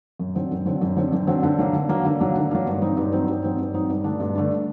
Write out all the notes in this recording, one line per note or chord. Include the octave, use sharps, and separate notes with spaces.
F#2
D3 F#3 C4
F#2
D3 F#3 C4
F#2
D3 F#3 C4
F#2
D3 F#3 C4
D3
F#3 A#3
D3
F#3 A#3
D3
F#3 A#3
D3
F#3 A#3
G2
F#3 C4 D#4
G2
F#3 C4 D#4
G2
F#3 C4 D#4
G2
F#3 C4 D#4
G2
D3 A3 D4
G2
D3 A3 D4